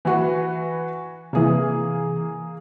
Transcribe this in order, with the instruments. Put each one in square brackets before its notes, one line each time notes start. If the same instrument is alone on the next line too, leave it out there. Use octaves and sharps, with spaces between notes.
[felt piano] E3 F#4 B4
[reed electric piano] C3 E3 [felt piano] A#3 G#4